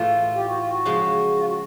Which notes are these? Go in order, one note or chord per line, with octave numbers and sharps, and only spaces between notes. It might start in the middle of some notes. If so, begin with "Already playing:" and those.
Already playing: A2 E3 A3 F4
G4
F#4
F4
F#4
C#3 F3 G#3
F4
F#4